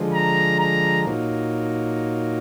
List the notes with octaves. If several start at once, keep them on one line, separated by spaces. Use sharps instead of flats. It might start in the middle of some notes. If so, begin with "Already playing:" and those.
Already playing: D3 F3 G#3
A#5
A#5
A#2 F#3 A#3 D#4